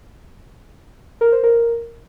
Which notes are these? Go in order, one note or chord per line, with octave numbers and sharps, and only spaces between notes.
A#4
C5
A#4